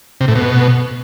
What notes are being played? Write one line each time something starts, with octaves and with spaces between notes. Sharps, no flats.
C3
A2
B2